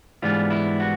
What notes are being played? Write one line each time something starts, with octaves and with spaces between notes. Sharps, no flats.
G#2 E3 G3 B3 D4 F4
E4
F#4